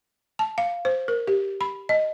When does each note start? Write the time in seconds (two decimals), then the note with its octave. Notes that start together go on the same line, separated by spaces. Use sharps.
0.39 A5
0.58 F5
0.85 C5
1.08 A#4
1.27 G4
1.61 B5
1.89 D#5